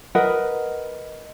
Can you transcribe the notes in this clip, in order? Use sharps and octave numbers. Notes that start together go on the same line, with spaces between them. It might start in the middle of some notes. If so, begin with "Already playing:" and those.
A#4 B4 D#5 F#5